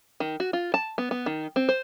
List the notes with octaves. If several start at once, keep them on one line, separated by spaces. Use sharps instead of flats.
D#3
F#4
F4
A5
B3
B3
D#3
C4
C5